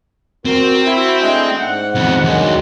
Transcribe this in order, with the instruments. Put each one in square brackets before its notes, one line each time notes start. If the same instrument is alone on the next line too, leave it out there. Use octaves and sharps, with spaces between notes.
[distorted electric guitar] C4 [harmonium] F#4 A#4
[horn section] E4 [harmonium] F#4 E5
[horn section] G#3 G5 [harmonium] A3 D4
[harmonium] G#2 [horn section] F#5
[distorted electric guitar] F2 B3
[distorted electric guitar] D2 [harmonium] D#3 F#3 G#3